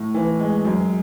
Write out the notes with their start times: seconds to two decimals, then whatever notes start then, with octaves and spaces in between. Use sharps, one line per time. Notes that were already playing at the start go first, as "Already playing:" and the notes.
Already playing: A2
0.14 E3
0.40 G#3
0.65 F#2